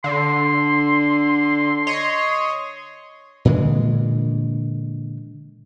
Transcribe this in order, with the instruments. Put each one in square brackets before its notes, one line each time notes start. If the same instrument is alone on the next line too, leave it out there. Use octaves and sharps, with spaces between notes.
[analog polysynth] D3 [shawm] C6
[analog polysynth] C#5 D#5
[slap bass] A#2 D3 E3 G#3